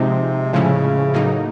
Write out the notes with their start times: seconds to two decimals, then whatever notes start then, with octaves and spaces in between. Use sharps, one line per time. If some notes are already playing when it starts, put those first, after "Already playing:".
Already playing: C3 F3 G#3 C4 D#4
0.53 A2 C#3 F3 G#3 C#4 E4
1.14 A2 F#3 A#3 D#4